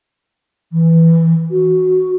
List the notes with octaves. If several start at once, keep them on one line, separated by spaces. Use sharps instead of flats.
E3
F#4